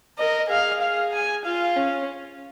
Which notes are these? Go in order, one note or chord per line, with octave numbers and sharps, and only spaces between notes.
A#4 D#5
G#4 F5
F5
G#5
F4 F5
C#4